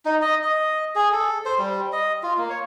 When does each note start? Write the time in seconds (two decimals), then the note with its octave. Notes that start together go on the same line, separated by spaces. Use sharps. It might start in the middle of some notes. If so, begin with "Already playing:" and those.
0.05 D#4
0.22 D#5
0.43 D#5
0.95 G#4
1.12 A4
1.45 C5
1.58 G3
1.92 D#5
2.23 F4
2.38 A#3
2.50 C#5